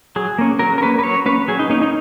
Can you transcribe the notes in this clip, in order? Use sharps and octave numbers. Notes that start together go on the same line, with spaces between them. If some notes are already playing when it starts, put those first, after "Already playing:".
F#3 G#4
A#3 C#4
F#3 A#4
A#4
A#3 C#4 B4
B4
F#3 C#5
A#3 C#4 B4
F#3 G#4
D#4
A#3 C#4 D#4
D#4